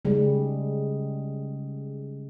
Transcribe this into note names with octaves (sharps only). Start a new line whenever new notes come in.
C#3 G3 G#3